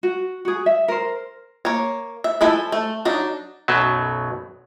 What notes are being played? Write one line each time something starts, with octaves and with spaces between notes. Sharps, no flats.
F#4
F#4 G#4
E5
A#4 C5
A#3 C#5
E5
F3 E4 A4 E5 G#5
A3
F#3 D4 D#4
B1 F#2 B2 F#3